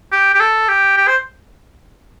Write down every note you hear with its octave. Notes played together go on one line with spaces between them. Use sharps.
G4
G4
A4
G4
G4
C5